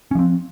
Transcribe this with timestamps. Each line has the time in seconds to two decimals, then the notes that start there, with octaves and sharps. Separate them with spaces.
0.11 C#4
0.15 F3
0.19 C4